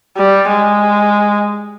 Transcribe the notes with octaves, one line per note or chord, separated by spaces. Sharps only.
G3
G#3